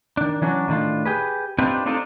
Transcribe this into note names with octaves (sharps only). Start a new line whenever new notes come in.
D#3 D4
E3 F#3 C#4 D4
A2 D#3 D4 F4
G4 G#4 B4
C4 D4 D#4 F4 G4 B4
C4 D4 D#4 F4 A4 C5